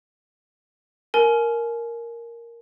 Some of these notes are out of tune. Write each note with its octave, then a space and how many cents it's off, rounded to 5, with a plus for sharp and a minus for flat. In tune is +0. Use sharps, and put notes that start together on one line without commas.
A#4 +0 G#5 +35